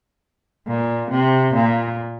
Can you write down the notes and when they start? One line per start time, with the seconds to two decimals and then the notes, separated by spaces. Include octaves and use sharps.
0.68 A#2
1.11 C3
1.54 A#2